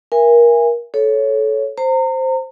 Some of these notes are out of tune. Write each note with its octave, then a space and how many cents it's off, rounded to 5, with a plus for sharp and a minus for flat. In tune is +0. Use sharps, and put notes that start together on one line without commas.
A#4 +25 E5 +30 G#5 -25
A4 -15 C#5 +0
C5 +0 A#5 -35